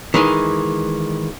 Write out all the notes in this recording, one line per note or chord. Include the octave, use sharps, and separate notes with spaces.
D#3 E3 G#3